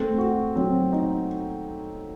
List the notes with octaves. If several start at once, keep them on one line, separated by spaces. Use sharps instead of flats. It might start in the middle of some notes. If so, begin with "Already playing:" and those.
Already playing: A3 C4
F#4
F#3 C4
D#4